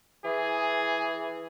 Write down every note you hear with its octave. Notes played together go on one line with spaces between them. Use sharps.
E3 G#4